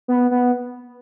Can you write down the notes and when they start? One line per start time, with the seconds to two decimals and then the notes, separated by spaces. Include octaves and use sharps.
0.08 B3
0.31 B3